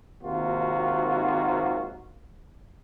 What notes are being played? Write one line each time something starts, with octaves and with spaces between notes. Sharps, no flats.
G#1 D#2 C3 A#3 F4 F#4